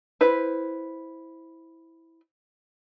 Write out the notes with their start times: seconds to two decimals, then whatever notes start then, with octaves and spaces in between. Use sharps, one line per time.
0.21 E4 B4 C5